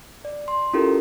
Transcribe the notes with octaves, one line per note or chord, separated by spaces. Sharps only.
D5
C6
C#4 E4 F4 G4 A4 A#4